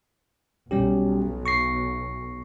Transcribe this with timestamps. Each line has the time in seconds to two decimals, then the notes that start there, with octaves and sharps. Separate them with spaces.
0.71 B1 G3 C#4 G4
1.46 C#6 A#6 C7